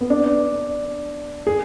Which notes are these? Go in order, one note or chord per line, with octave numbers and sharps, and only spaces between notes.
B3
D4
G#4